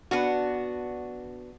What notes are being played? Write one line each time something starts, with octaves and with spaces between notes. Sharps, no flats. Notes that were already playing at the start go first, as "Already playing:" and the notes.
B3 D4 F#4